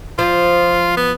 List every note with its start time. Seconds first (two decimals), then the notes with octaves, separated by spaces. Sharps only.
0.19 F3 F4
0.97 B3